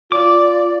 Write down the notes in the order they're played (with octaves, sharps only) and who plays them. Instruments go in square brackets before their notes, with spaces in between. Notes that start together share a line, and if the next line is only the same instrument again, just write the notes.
[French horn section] F4 [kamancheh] D5 [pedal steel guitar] D6